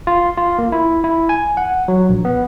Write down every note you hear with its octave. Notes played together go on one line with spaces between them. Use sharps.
F4
F4
A#3
E4
E4
G#5
F#5
F#3
A#1
B3